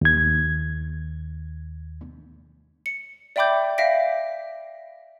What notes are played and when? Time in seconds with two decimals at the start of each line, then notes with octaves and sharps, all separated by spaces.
0.01 D#2 G#6
2.86 C#7
3.36 D5 E5 G5 B5 D6 G6
3.78 E5 F5 A#6 B6 D7